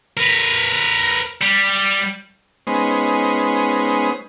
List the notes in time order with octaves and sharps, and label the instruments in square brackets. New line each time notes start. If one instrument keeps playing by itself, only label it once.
[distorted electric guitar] A#4 B4
G3
[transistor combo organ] G#3 B3 C#4 D#4 C5